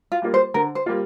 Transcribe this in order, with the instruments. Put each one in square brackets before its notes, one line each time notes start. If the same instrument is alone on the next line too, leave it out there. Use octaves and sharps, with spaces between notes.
[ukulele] F4
[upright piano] G3 A#3 F4
[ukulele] C5
[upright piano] D3 [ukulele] A#4
[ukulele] C5
[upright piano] G3 A#3 F4